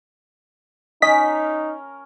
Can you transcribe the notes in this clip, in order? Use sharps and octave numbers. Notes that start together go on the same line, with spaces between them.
C#4 D#4 A#4 D#5 B6